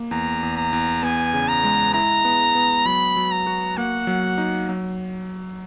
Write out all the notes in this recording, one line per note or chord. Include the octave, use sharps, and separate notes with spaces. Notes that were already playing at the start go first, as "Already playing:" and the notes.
Already playing: A#3
E2 A#5
E2
A#5
E2
B3 G#5
C#3
A#5
G#3
E4 A#5
B3
B3
F#3 B5
F#3
A#5
F#4
A#3 F#5
F#3
D#4
F#3